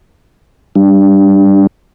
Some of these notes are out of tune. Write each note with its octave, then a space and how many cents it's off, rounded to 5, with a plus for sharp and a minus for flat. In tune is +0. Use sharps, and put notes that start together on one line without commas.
G3 +0 D4 +0